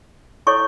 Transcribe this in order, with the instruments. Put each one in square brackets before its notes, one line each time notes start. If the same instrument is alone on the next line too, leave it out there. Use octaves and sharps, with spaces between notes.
[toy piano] E4 A4 C#5 C#6